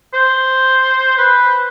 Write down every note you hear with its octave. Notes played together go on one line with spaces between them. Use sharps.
C5
B4